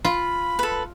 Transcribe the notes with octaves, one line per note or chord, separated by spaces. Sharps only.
F4 B5
A4 B4